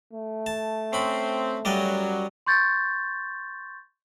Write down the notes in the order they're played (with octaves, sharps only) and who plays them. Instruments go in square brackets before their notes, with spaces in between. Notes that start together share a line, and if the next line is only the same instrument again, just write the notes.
[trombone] A3
[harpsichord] A5
[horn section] C4 [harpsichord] C#4 B5
[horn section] F#2 F#3 [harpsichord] G3 D5 D#5
[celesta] C6 C#6 G6 A6